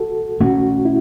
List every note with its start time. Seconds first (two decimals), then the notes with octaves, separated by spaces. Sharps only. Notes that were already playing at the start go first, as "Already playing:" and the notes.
Already playing: F#4 A4
0.40 B2 A3 C#4 F#4
0.85 E4